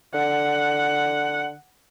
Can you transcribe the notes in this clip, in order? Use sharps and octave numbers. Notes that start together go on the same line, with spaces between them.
D3 F#5